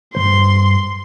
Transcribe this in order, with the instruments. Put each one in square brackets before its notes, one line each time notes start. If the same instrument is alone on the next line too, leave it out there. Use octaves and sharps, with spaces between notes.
[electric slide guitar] G2 E3 C5 [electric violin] C6